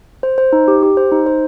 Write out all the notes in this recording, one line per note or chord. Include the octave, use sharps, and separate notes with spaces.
C5
C5
D#4
G4
G4
C5
D#4
C5